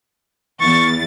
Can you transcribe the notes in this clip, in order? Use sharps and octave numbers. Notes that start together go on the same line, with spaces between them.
E2 C#6 A6